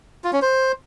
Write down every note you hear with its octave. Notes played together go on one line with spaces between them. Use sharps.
F4
C#4
C5